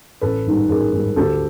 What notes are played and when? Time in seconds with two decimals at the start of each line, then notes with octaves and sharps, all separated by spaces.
0.21 A1 A4 B4
0.45 G#2 D#3 G3
0.69 A1 G#4 A#4
0.92 G#2 D#3 G3
1.16 D2 G4 A4